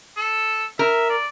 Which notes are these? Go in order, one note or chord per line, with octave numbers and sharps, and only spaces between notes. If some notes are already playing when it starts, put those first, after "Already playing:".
A4
A#4 E5
D5